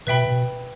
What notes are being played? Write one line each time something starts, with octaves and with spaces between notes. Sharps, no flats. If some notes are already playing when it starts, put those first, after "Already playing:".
B2 B4 E5 G5 B5
B2